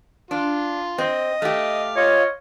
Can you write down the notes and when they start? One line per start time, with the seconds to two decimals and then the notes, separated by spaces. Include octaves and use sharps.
0.31 D4 F4
0.98 C4 D#5
1.42 A3 G4 F5
1.96 F4 C#5 D#5